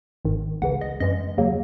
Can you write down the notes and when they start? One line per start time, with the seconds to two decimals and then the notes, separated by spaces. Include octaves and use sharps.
0.25 G#1 G#2 D#3
0.62 C#2 C#3 E3 F#5
0.81 D#5
1.00 F#2 E3 G#3 D#5
1.38 D#2 C#3 F#3 A#3